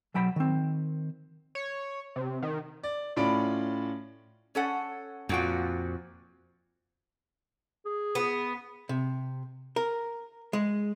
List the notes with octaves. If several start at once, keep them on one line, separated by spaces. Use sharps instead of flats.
B1 F#3 G5 B5
D#3 C4
C#5
C3
D#3
D5
A2 C#4 F4 D5 B5 D7
C#4 A4 F#5
F2 A#2 F#4 G5
G#4
B3
C3
A#4
G#3